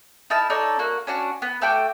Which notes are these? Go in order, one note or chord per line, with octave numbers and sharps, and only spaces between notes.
D#4 E4 A5 F6
D#4 A4 C#5 D5
A#3 F#4
C#4 D4 F#4
B3
A3 F#4 G5 D6